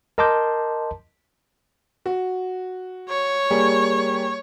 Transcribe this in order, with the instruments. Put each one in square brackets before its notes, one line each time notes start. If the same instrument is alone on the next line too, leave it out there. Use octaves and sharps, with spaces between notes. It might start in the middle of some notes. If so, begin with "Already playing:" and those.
[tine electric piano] A#4 D#5 A5 C6 D6 G6
[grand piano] F#4
[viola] C#5
[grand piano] G3 A#3 G#4